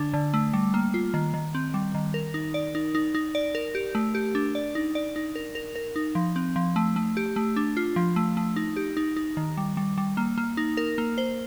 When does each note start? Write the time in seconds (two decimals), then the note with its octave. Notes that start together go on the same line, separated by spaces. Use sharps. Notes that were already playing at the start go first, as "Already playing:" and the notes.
Already playing: D3 D4
0.14 D3
0.34 A3
0.53 G3
0.74 A#3
0.94 F4
1.14 D#3
1.34 D#3
1.55 C4
1.74 G3
1.94 D#3
2.14 A#4
2.34 D#4
2.54 D5
2.75 D#4
2.95 D#4
3.15 D#4
3.35 D5
3.55 A#4
3.75 G4
3.95 A3
4.15 G4
4.35 D4
4.55 D5
4.75 D#4
4.95 D5
5.16 D#4
5.35 A#4
5.55 A#4
5.76 A#4
5.96 D#4
6.15 F3
6.36 C4
6.56 F3
6.76 A3
6.96 A3
7.17 G4
7.36 A3
7.56 D4
7.77 F4
7.96 F3
8.16 A3
8.37 A3
8.56 D#4
8.76 G4
8.97 D#4
9.16 D#4
9.37 D#3
9.57 G3
9.77 G3
9.98 G3
10.17 A#3
10.38 A#3
10.57 D#4
10.77 A#4
10.98 A#3
11.18 C5